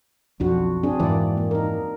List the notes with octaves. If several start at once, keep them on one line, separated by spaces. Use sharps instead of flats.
B1 F2 D4 F#4
C4 D4 G#4
F2 G#2 E3 A#3 D5
A#3
D#4 A#4